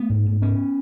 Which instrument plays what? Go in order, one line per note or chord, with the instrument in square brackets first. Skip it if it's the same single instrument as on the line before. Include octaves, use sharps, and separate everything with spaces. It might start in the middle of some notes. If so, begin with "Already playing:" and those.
Already playing: [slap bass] A3 B3
G#2
G#2
G#2 B3 C#4